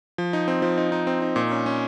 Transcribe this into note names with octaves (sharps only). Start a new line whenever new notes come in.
F3
D#4
C4
F3
D#4
D#4
C4
D#4
A#2
C#4
C#4